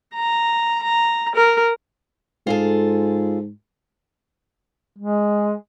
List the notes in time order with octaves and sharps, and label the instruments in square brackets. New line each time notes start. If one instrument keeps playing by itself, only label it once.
[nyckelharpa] A#5
A#5
A#4
[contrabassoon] G#2 [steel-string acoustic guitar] F4 G#4 A4
[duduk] G#3